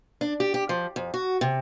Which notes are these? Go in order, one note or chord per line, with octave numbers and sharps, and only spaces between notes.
D4
G4
G4
F3
F2
F#4
C3